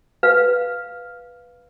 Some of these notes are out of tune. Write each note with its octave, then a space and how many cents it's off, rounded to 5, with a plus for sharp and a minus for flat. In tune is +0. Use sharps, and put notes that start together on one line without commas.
B4 -5 F5 +0